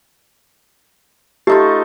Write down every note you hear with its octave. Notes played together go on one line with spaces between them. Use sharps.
A3 D#4 F4 G4